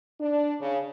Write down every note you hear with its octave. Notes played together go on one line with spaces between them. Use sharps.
D4
C#3